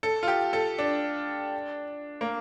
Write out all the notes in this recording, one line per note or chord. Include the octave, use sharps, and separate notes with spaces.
A4
F4
G4
A4
D4
A#3